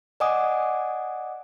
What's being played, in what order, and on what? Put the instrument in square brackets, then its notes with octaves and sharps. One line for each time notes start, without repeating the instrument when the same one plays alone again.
[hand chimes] D5 D#5 F#5 G#5 D6 D#6